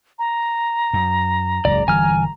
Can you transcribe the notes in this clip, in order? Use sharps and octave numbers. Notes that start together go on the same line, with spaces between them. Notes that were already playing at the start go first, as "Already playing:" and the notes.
A#5
F#2
F#1 C#2 G#2 D5
G1 E3 G3 G#5 F6